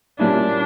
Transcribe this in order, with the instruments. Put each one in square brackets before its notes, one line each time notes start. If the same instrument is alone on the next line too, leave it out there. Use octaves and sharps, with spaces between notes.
[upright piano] A#2 G3 C#4 E4 [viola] D4